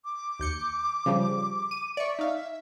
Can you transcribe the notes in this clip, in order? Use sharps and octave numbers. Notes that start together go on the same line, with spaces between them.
D6
D#2 G6 C#7
C#3 F3 G3
D#7
D5 E5 C#6
D#4 F5